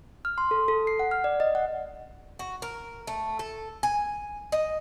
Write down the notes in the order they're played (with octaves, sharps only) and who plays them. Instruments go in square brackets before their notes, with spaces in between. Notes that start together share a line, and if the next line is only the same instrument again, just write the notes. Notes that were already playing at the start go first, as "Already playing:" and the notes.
[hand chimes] F6
C6
A4
A4
C7
F#5
F6
D5
D#5
F#5
[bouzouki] F#4
A#4
A3
A4
G#5
D#5